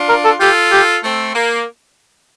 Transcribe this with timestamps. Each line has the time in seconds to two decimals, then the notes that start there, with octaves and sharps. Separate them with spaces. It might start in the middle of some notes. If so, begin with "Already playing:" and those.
Already playing: D4 F4
0.09 A#4
0.25 A4
0.41 F4 G4 A4
0.72 G4
1.04 A3 C4
1.35 A#3